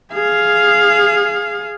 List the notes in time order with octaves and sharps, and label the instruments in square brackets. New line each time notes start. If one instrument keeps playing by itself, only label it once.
[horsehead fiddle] G#4 F5